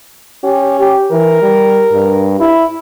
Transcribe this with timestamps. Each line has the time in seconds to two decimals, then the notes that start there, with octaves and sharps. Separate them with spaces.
0.44 C#4 G4
0.80 G4
1.12 E3 A#4
1.42 G3
1.93 G2
2.40 E4